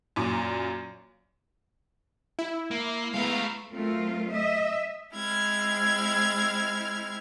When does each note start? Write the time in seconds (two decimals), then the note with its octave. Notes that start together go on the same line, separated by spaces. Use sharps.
0.16 F#2 A#2 D6
2.39 E4
2.71 A#3
3.14 G#3 A3 B3 F5 A#5
3.72 F#3 A3 C4 F4 A#4
4.31 D#5 E5
5.13 G#3 C4 E4 F6 G#6